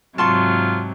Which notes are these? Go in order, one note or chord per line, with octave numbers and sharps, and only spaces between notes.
G#2 C3 F#3 F4 A5 C6 C#6